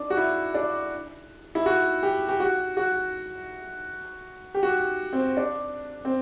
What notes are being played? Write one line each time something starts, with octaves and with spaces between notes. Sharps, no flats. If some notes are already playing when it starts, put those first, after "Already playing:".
Already playing: D4
F#4
E4
D4
E4
F#4
G4
G4
F#4
F#4
G4
F#4
C4
D4
C4